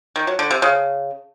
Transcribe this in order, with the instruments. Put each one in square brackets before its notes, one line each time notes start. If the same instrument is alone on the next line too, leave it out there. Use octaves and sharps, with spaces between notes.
[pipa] D#3
F#3
D3
C3
C#3